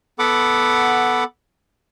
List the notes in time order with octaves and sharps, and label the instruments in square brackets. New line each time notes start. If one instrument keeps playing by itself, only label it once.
[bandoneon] B3 A4 F#5 B5 D6